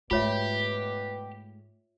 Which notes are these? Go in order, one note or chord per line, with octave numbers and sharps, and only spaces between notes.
G#2 B2 A3 F4 G4 B4 C#5 E5